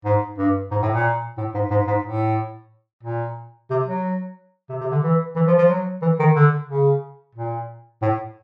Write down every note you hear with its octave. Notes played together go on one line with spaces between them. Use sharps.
G#2
G2
G#2
A2
A#2
A2
G#2
G#2
G#2
A2
A#2
C3
F#3
C3
C3
D3
E3
E3
F3
F3
F#3
E3
D#3
D3
C#3
A#2
A2